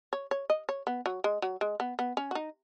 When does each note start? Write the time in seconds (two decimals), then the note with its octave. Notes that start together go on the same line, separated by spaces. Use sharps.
0.13 C#5
0.31 C#5
0.50 D#5
0.69 C#5
0.87 B3
1.06 F#3
1.24 G#3
1.42 F#3
1.61 G#3
1.80 B3
1.99 B3
2.17 C#4
2.31 F#4
2.35 D#4